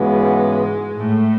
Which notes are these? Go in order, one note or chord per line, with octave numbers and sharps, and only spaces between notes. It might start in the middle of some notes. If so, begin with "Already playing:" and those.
Already playing: G#2 C#3 E3 G#3 B3 F#4
A2 A3